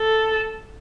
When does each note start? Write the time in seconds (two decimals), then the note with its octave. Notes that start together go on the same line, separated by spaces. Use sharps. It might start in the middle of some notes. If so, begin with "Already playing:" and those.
Already playing: A4